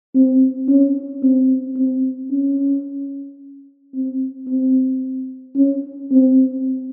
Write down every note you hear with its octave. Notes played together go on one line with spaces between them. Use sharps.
C4
C#4
C4
C4
C#4
C4
C4
C#4
C4